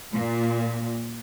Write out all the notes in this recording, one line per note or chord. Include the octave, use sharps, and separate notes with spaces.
A#2